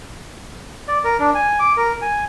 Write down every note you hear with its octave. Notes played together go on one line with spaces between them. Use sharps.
D5
A#4
D4
G#5
D6
A#4
G#5